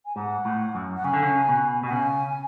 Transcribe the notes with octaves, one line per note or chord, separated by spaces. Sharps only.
G#5
G#2 F#5
A2
F#2
F#5
C#3 G#5
D3
C#3
B2
B2
F#5
C#3 G#5